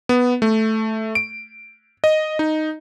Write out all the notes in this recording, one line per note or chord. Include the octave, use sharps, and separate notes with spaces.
B3
A3
D7
D#5
D#4